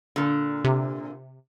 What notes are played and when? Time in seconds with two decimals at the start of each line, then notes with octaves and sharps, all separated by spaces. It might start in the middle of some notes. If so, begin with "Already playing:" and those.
0.16 A#2 D3
0.64 C3